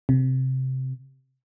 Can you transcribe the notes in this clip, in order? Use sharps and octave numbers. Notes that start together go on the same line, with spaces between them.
C3